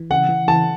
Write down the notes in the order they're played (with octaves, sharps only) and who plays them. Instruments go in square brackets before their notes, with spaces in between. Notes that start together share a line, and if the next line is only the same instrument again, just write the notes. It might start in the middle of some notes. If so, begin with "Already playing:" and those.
Already playing: [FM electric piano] E3
[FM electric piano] C#3 [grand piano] F#5
[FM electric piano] E3
[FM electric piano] E3 [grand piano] A5